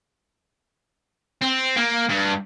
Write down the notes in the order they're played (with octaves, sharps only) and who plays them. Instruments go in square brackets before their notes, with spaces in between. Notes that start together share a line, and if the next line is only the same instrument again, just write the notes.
[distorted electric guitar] C4
A#3
G2